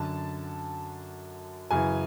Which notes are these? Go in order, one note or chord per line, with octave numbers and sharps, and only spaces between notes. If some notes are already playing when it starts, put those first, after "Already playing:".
Already playing: F#2 D3 A5
F#2 C#3 E3 G#5